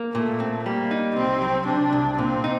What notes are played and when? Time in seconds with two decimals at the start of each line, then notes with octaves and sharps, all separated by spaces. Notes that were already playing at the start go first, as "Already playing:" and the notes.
Already playing: A#3
0.14 A#2 A3
0.40 C4
0.65 G3 A#3
0.91 D#4
1.16 C2 C4
1.42 F#3
1.67 C3 D4
1.93 C2
2.18 A#2 C4
2.44 D#4